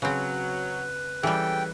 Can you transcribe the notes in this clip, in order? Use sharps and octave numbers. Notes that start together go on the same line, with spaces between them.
C#3 F#3 C4 B4
C#3 E3 G3 G4 A4 G5